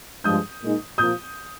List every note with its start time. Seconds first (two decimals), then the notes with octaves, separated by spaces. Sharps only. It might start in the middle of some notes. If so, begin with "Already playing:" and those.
0.24 G2 F3 G#3 D#6 G6
0.61 A#2 G#3 D#4
0.98 A#2 F3 A#3 F4 D#6 G6